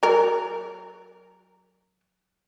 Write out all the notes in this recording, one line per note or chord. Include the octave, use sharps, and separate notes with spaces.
F#3 A#4